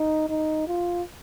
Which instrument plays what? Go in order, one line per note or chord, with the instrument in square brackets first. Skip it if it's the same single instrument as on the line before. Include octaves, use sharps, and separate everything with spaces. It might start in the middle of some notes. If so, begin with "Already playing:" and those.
Already playing: [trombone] D#4
D#4
F4